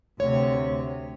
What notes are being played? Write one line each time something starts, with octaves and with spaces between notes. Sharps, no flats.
D2 C3 C#5